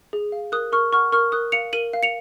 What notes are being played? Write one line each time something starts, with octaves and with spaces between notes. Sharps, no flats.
G#4
F5
A#4 D#6 F#6
A#4 C#6 F6
F#5 C#6 F6
A#4 C#6 F6
A#4 D#6 F#6
F5 C#7 F7
A#4 D#7 F#7
F5
C#7 F7